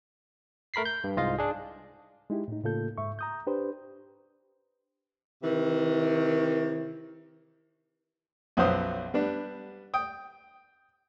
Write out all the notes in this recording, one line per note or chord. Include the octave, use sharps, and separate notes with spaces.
A3 A#4 B5 B6 C7
G6
G2
C2 G#2 F4 D#5 F5
D4 G#4
G#3 D#4 E4 G4
A2 D#4
A2 C#3 A#3 F4 A4 G6
G#2 E5 C#6
A#5 D#6 G6
D4 G4 B4 C5
C3 D#3 E3
B1 F#2 F3 B3 C5 D#6
G3 B3 D4
G5 D#6